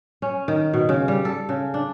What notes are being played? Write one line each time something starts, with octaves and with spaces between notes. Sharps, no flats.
C#4
D#3
B2
C#3
G3
A4
C#3
D4